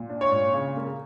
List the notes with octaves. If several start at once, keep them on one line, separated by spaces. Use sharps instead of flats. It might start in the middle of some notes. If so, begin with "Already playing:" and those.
Already playing: A#2
D4
C#5
A#2
C#3
A#3